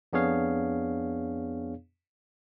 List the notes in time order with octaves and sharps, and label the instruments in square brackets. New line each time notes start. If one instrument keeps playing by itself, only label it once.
[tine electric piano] F2 B3 D4 G#4 C#5 F5